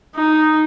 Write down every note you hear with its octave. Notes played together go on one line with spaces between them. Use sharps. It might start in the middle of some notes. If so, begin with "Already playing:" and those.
D#4